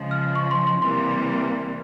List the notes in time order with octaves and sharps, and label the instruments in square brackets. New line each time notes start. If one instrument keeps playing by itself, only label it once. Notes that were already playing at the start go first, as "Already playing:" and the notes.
Already playing: [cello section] C#3 F3 G#3
[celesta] F6
C#6
C6
C6
[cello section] C3 E3 G3 A#3 [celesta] C6